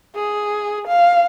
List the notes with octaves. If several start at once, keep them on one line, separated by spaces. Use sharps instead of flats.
G#4
F5